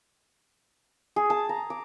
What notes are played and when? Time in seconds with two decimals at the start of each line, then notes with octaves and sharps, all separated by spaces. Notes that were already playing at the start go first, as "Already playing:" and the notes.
1.16 G#4
1.30 A5
1.49 A#5
1.70 D6